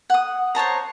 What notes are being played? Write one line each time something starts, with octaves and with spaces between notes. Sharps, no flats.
F#5 D#6
C5 C#5 A5 A#5